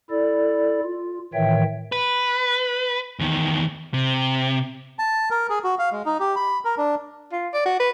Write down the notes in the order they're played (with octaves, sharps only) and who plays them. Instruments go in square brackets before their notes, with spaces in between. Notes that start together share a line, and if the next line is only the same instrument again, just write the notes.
[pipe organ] E4 A4 D5
F4
A2 D#3 E3 C#5 E5 G5
[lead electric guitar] B4
E2 D#3
C3
[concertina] A5
A#4
G#4
F#4
F5
G#3
D#4
G4
B5
A#4
D4
[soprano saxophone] F4
D5
F#4
B4